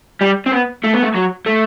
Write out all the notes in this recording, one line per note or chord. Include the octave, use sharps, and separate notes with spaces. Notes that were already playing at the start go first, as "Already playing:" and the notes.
G3
C4
B3
A3
B3
A3
F#3
A3